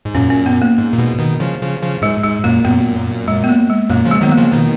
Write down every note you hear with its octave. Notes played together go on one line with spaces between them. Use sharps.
G#2
F#2 A#2 C#4
C#4
B3
A#3
G#2
A#2
G#2 B2
B2 D#3
C#3 F3
C#3 F3
C#3 F3
G#2 G#3
G#2 G#3
F#2 A#2 A#3
F#2 A#2 B3
G#3
B3
A#3
G#3
F#2 A#2 A#3
C#3 F3
G#3
D#3 F#3 B3
A#3
C#3 F3
B2 D#3